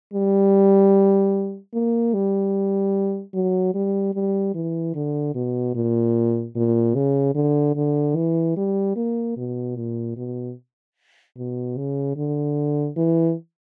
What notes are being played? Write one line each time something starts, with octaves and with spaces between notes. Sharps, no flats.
G3
A#3
G3
F#3
G3
G3
E3
D3
B2
A#2
A#2
C#3
D3
D3
E3
G3
A#3
B2
A#2
B2
B2
C#3
D3
E3